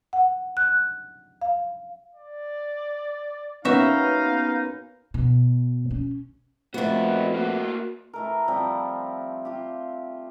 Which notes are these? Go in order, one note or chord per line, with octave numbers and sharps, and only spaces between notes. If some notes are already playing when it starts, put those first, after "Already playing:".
F#5
F#6
F5
D5
A#3 B3 C#4 D#4 F#4 E5 F5
B2
C#4
A#2 F3 A3 B3 C4 E4 F#4
A#3 F#4
E3 A3 A#4
F3 G3 C4 E5
F4 G4